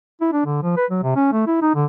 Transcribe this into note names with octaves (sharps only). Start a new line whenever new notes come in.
E4
D4
D3
F3
B4
F#3
C3
C#4
A3
E4
D#4
D3